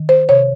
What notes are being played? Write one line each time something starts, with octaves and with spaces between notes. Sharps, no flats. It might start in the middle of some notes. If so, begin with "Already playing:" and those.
Already playing: D#3
C5
C3 C#5